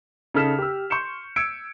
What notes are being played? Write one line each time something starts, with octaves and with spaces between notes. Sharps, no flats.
C#3 D#4 A4 F6 B6 E7
G4 E6
C6 C#6 G6 C#7 E7
E6 G#6 C#7 D7